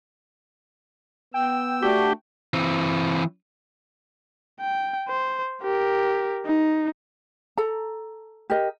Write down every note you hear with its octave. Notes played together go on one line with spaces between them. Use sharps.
B3 G5 E6
A3 D4 F#4 G4
E3 C4
G5
C5
G4 A#4
D#4
A4 A#5
G4 A#4 D#5